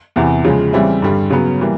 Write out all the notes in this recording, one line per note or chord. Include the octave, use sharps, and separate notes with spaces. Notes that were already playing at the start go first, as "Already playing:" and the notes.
E2 C3 E3
C#3 F3 G#3
C#3 E3 G3 C4 E4
G2 D3 G3
C#3 F#3 B3
E3 G3 A#3